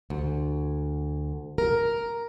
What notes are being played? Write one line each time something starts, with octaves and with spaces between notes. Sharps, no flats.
D2
A#4